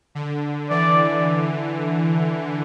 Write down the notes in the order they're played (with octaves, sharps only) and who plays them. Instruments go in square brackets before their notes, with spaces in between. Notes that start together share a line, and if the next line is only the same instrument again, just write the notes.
[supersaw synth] D3
[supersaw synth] E3 [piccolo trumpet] D5